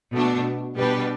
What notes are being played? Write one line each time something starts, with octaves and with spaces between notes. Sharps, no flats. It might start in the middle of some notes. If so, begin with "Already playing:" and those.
B2 A3 D4
B2 G3 D4 G4 B4